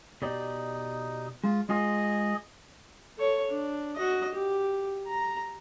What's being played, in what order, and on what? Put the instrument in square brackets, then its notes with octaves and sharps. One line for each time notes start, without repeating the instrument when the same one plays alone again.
[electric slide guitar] B2 G4 D5 [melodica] D#4
[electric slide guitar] G#3 [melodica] F4
[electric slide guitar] G#3 F4 G#5 [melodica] G#4 D#5
[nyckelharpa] A4 C#5
D4
F#4 D#5
G4
A#5